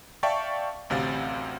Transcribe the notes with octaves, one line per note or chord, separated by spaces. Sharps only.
D5 E5 F5 G5 A5 C#6
A1 D2 C3 F5 A6